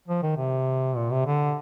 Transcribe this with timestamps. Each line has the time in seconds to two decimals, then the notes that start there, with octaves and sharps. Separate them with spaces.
0.08 F3
0.23 D#3
0.37 C3
0.96 A#2
1.11 C3
1.26 D3